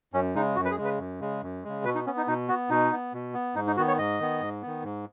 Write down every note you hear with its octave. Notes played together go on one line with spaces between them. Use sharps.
F#2 C#4
C#3 G#3 D#4
F#2 F#4
B4
G#4
C#3 G#3
B4
F#2
C#3 G#3
F#2
C#3 G#3
B2 B4
D#4
B3 C#4
D#4
B2 D#4
B3 F#4
B2 D#4
B3
B2
B3
G#2 D#4
D#4
D#3 B3 F#4
C#5
G#2 D#5
D#3 B3
G#2
D#3 B3
G#2